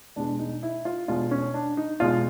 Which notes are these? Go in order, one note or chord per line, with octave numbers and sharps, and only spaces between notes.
E2 B2 G#3 D4
D#4
E4
F4
E2 B2 G#3 F4
C#4
D4
D#4
E2 B2 G#3 F4